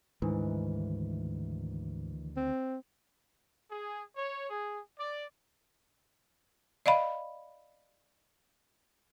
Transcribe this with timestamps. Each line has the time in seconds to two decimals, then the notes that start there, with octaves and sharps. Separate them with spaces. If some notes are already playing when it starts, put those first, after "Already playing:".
0.22 D2 G#2 D#3 E3 D4
2.36 C4
3.70 G#4
4.16 C#5
4.50 G#4
4.98 D5
6.86 D5 D#5 F5 B5